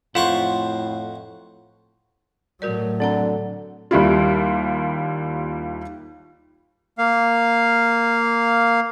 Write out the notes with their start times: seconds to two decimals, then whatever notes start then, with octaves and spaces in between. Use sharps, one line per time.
0.15 F2 A2 F4 C5 F#5 C#6
2.62 A2 F#3 F#4 A#4 D5
3.00 D3 C4 F#5 A#5
3.91 D#2 G3 E4 F4
6.98 A#3 F5